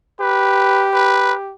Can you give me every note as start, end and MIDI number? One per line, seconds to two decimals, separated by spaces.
0.20 1.54 67
0.20 0.88 71
0.94 1.34 71